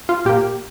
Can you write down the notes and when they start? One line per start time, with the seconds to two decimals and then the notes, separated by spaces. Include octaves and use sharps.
0.09 F4
0.25 A#2 A#3 G4